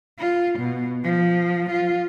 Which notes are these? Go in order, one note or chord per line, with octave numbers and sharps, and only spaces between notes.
F4
B2
F3
F4